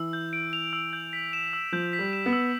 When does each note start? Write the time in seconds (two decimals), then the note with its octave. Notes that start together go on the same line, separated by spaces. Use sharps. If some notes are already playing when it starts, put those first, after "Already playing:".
Already playing: E3 E6
0.13 G6
0.33 D7
0.53 F7
0.73 E6
0.93 G6
1.13 B6
1.33 E7
1.53 E6
1.72 F3 G6
1.93 B6
1.99 G3
2.13 E7
2.26 B3
2.33 E6